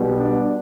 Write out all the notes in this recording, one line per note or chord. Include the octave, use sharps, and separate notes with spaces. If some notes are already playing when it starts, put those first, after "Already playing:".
Already playing: B1 B2 G3
D4